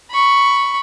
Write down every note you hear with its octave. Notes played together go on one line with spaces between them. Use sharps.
B5 C#6